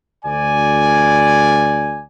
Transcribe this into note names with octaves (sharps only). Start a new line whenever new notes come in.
D2 D5 G#5